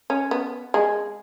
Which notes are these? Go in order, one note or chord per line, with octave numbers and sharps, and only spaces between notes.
C#4
B3
G#3